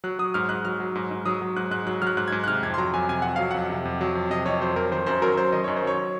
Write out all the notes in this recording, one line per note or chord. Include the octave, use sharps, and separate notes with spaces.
F#3 F#6
F#3 D#6
G#2 F6
G#2 F#6
F#3 F6
F#3
G#2
G#2
F#3 D#6
F#3
G#2 F#6
G#2 F#6
F#3 F#6
F#3 F6 F#6
G#2 F#6
G#2 G#6
F#6
C3 F6
F2 G#6
C6
F#3 A#5
F2 G#5
C3 G#5
F2 F#5
F#3 F5
F2 F#5
C3
F2
F#3
F2
C3 D#5
F2 C#5
F#3 C5
F2 A#4
D#3 C5
F#2 C5
F#3 A#4
F#2 C5
D#3 D#5
F#2 C#5
C5
F#3 C#5